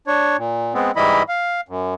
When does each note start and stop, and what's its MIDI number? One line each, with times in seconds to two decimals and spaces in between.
0.07 0.37 62
0.07 0.37 73
0.38 0.74 46
0.74 0.91 56
0.74 0.91 59
0.74 0.91 60
0.96 1.23 44
0.96 1.23 52
0.96 1.23 55
0.96 1.23 64
0.96 1.23 75
0.96 1.23 83
1.29 1.61 77
1.69 1.94 42